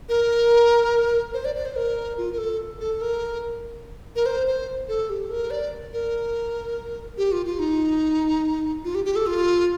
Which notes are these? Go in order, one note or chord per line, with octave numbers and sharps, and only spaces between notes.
A#4
C5
D5
D5
C5
A#4
F4
A#4
A4
A4
A#4
A#4
C5
C5
A4
G4
A#4
D5
A#4
G4
F4
F4
D#4
F4
G4
G4
A4
F4